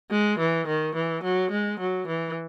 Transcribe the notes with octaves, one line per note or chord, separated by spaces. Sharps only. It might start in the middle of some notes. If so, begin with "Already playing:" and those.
G#3
E3
D#3
E3
F#3
G#3
F#3
E3